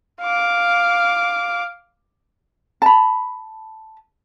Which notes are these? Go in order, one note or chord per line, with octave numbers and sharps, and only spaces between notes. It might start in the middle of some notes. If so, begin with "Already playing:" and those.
F5 D6
A5 B5